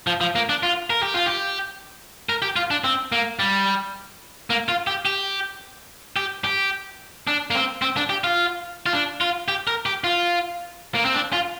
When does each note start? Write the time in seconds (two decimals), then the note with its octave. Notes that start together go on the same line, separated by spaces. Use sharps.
0.07 F3
0.21 F3
0.36 A#3
0.49 D4
0.63 F4
0.90 A#4
1.03 G4
1.14 F4
1.26 G4
2.29 A#4
2.42 G4
2.56 F4
2.71 D4
2.84 C4
3.12 A#3
3.39 G3
4.50 A#3
4.69 F4
4.87 G4
5.05 G4
6.16 G4
6.44 G4
7.27 D4
7.51 A#3
7.55 C4
7.82 C4
7.97 D4
8.10 G4
8.24 F4
8.86 F4
8.93 D4
9.21 F4
9.48 G4
9.67 A#4
9.86 G4
10.04 F4
10.95 A#3
11.05 C4
11.14 D4
11.33 F4